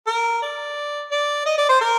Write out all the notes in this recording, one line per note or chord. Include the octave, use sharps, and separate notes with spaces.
A#4
D5
D5
D#5
D5
C5
A#4